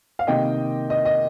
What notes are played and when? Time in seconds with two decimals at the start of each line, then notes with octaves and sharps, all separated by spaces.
0.19 F5
0.27 C3 D#3 A#3 D#4 D#5 G5
0.90 D#5
1.05 D#5